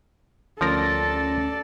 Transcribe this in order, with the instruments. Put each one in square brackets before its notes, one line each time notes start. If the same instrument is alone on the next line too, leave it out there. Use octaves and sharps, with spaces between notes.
[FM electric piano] D2 C#4 A#6 [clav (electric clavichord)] F3 A#4 [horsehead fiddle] A4 D5